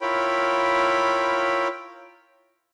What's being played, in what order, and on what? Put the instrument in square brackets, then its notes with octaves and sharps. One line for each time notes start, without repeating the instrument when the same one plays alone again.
[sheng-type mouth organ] E4 F4 A#4 C#5 G5 B5